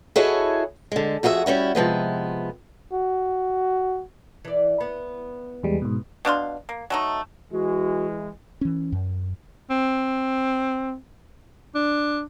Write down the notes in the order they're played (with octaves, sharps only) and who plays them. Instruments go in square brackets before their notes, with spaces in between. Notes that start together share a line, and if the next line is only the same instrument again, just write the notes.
[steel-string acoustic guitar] E4 F#4 G#4 A4 C#5 D#5
D3 G#3
F2 F#4 G#4 A4 E5
G3 C#4 E4 F#4
C3 F3 G#3 B3
[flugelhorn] F#4
[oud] E3 D5
B3
[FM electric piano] E2 G3 G#3
G#2 B2
[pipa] B2 D4 F5 C6
A#3
F#3 A3 D#4
[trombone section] E3 G#3 [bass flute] F#4
[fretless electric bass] E3 C#4
F#2
[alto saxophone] C4
D4